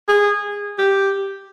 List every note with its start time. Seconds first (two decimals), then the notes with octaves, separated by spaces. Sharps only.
0.08 G#4
0.78 G4